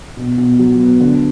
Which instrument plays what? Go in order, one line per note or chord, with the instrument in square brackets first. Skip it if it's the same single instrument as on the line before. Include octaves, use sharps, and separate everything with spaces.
[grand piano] B2
B2
F#3
B3
D3